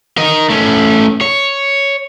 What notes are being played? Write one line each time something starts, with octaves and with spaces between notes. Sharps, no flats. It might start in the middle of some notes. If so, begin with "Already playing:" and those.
A#4 D#5
A3 C#4
C#5